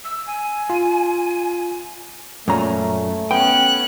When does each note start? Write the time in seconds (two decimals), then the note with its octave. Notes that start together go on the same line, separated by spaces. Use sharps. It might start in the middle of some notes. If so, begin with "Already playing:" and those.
0.04 E6
0.27 G#5
0.70 F4
2.48 F#2 A#2 A3 C#4 A#5
3.31 B3 C#4 G5 F#6